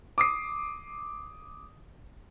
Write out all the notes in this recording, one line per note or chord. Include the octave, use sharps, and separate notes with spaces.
D6 D#6 C7